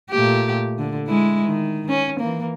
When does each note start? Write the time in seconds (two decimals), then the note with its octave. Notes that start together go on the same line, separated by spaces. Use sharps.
0.11 A#2 A3 G4
0.78 D3
1.07 G#3 E4
1.43 D#3
1.88 C#4
2.20 E3 A#3